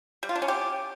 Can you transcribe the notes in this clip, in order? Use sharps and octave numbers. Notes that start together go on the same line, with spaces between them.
G3
F4
D4
C#4
G4